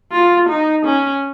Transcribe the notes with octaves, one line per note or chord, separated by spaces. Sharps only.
F4
D#4
C#4